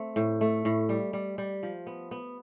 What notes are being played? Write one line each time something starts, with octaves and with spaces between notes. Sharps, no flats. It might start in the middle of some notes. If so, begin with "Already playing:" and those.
Already playing: A3 C4
A2
A3
A2
G3
G3
G3
F3
B3
B3